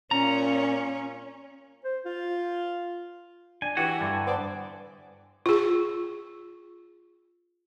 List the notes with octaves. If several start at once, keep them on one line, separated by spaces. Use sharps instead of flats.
A#2 C#4 A#5
C5
F4
D4 G#5
E3 F#4 G4
G2 D3
B3 C5 D5
F4 G#4